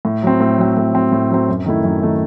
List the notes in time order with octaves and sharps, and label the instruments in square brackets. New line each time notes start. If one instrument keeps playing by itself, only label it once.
[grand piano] A2
F#3 C4
A2
F#3 C4
A2
F#3 C4
A2
F#3 C4
F#2
D#3 A3 E4
F#2
D#3 A3 E4